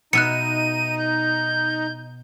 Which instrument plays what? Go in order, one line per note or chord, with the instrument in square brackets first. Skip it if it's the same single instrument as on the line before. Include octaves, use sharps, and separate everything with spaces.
[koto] B2 E5 [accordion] D#4 [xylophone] F#6 C#7 [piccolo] D#7
[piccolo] G6